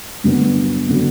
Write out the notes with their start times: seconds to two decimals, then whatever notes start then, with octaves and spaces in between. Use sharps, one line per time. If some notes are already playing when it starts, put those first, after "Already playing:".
0.24 G2 D3 F#3 B3
0.88 D3 F#3 B3